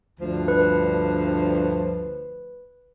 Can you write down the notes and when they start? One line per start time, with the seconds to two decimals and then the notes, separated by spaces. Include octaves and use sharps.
0.19 D2 G2 F3
0.48 B4